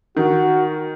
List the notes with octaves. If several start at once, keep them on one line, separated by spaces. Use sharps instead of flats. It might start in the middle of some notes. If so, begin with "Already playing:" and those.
D#3 F#4